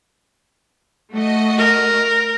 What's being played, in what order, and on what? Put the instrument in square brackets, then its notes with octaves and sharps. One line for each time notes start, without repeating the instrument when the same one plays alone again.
[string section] A3 F#4 D#5
[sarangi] A#4